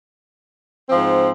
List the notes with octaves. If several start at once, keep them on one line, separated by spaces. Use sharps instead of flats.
G#2 F3 C4